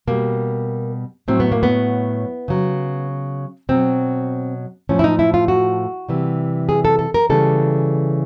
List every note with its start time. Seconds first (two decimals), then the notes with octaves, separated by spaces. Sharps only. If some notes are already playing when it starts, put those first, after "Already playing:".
0.07 B2 G3 A#3
1.28 A2 F#3 C4
1.40 B3
1.52 A#3
1.63 B3
2.48 C#3 F#3
3.69 B2 F#3 C4
4.89 A2 F3 C#4
4.99 E4
5.04 D#4
5.19 E4
5.34 F4
5.48 F#4
6.09 C3 E3 G3
6.69 G#4
6.85 A4
6.99 A4
7.14 A#4
7.30 C#3 E3 G3 A4